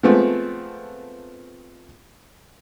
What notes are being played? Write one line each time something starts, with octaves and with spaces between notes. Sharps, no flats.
F3 G#3 A3 B3 C4